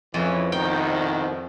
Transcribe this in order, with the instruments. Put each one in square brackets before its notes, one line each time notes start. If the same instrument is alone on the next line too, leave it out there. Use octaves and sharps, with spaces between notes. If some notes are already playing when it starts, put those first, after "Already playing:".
[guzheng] F2 [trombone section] C#3 E3
[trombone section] C2 B2 D#3 [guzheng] G5